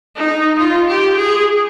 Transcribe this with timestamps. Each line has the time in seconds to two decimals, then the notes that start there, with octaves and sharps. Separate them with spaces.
0.16 D#4
0.59 F4
0.88 G4
1.16 G#4